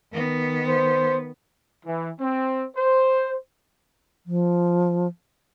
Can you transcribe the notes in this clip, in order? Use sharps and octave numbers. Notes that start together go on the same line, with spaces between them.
D#3 B3
C5
E3
C4
C5
F3